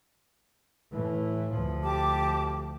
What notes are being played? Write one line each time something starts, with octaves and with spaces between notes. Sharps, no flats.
A2 E3
D2 F3
G4 A5 D6